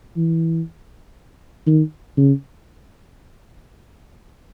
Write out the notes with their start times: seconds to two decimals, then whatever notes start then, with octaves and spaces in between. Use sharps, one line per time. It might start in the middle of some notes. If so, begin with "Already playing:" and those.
0.17 E3
1.67 D#3
2.17 C#3